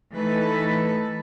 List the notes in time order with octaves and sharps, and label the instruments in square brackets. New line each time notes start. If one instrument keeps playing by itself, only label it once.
[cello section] E3 A3 D#4 A4 B4